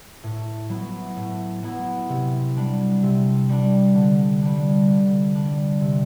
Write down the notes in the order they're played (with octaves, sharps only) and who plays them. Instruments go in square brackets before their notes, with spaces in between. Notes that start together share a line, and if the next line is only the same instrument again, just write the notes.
[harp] A2
F#3 B3 E4
A2
F#3 B3 E4
C3
G3 D4
C3
G3 D4
D3
G3 D4
D3
G3 D4
C3